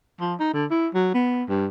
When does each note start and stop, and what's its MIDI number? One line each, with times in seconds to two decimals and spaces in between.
0.20 0.34 53
0.40 0.50 63
0.54 0.66 50
0.71 0.88 64
0.94 1.11 54
1.14 1.44 59
1.49 1.67 43